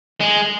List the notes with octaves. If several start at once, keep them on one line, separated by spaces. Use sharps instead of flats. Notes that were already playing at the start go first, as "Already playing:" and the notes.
G#3